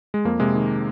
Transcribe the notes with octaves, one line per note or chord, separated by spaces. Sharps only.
G#3
F2 A#3
C3 G#3
D#3